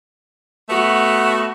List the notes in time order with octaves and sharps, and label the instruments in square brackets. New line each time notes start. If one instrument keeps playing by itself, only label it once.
[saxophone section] A3 B3 F#4